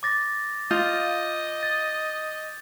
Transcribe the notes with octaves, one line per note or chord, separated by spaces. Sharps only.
D6 A6 A#6
F4 D#5 G6
A6